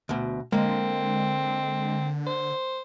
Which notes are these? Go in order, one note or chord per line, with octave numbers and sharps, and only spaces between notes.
D2 B2
D3 G#3 A#3 C4
C5